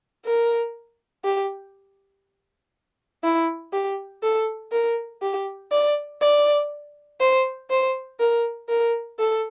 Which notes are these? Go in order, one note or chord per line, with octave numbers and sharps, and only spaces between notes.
A#4
G4
E4
G4
A4
A#4
G4
D5
D5
C5
C5
A#4
A#4
A4